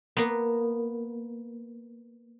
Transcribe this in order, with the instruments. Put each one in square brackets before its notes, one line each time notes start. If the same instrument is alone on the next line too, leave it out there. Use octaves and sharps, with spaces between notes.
[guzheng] A#3 B3